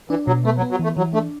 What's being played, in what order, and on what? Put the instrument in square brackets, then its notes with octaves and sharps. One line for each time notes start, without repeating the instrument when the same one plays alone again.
[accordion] E3 [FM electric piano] D4
[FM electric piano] B2 [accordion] F#3
[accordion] A3 [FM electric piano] B3
[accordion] F#3
[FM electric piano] B3
[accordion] F#3
[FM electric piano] E3 [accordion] A3
[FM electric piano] E3 [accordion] F#3
[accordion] A3 [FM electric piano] D4